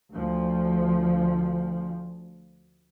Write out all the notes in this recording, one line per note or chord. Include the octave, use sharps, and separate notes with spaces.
D2 F3